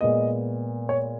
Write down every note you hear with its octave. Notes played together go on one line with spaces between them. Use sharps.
A#2 G#3 B3 D#5
C#5